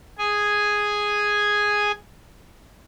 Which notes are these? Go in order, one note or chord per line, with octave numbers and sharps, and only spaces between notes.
G#4 G#5